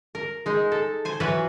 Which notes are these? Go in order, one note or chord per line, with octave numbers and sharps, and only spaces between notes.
A#4
G#3 D#4
A4
C5 G#5
E3 F#3 F4 F#4 B4